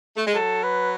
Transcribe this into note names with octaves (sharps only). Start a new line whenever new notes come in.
A3
G#3
F#3 A4
B4